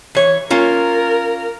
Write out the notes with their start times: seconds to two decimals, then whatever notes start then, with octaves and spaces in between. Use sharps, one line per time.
0.15 E3 C#5
0.50 A#3 C#4 F4 A#4